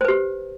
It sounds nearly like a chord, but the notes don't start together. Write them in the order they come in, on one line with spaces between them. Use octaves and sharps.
C5 B4 G4